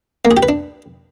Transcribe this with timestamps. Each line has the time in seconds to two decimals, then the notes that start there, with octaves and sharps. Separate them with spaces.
0.25 A#3
0.31 G#4
0.37 G4
0.43 B4
0.49 D4